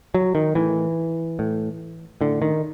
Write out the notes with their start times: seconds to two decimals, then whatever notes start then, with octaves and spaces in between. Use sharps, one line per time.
0.14 F#3
0.35 D#3
0.55 A2 E3
1.39 A2
2.21 A2 D3
2.42 D#3